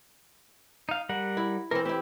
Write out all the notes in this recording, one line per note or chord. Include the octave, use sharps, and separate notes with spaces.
D#4 F5
G3 A#4 F#5
E4
E3 C4 A#4
C4 E4 G4